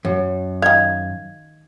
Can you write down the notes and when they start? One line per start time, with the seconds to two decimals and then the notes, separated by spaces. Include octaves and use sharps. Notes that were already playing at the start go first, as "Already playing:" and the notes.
0.05 F#2
0.62 D#3 F5 G#6